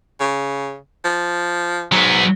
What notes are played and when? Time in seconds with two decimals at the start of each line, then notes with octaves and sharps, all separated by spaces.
0.20 C#3
1.05 F3
1.92 G#2 F#3 B3